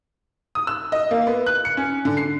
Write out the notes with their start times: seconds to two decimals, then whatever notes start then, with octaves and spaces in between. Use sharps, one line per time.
0.55 D#6
0.67 E6
0.92 D#5
1.11 A#3
1.27 B3
1.46 F#6
1.65 C#7
1.77 C#4
2.05 D3
2.17 C7